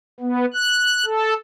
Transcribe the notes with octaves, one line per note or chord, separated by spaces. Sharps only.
B3
F#6
A4